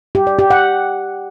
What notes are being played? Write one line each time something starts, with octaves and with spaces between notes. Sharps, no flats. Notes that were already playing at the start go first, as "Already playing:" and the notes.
G4
D5
G4
F#5